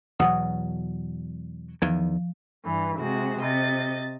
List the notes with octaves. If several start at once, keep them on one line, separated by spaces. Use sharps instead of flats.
E2 B2 F#3 F#5 D#6
E2 D#3 F3
G2 E3
C3 G#3 F#4
C3 D#5 A6